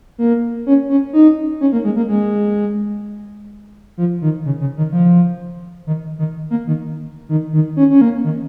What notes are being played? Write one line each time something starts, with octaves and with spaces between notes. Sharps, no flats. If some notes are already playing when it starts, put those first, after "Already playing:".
A#3
C#4
C#4
D#4
C#4
A#3
G#3
A#3
G#3
F3
D#3
C#3
C#3
D#3
F3
D#3
D#3
A#3
D#3
D#3
D#3
C#4
C#4
A#3
D#3